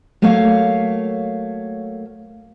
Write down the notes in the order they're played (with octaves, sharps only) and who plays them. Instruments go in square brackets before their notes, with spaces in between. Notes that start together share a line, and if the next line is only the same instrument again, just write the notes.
[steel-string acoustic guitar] F#3 A3 A#3 C#5 F5